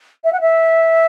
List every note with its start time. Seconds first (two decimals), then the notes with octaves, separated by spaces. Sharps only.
0.24 E5
0.32 F#5
0.40 E5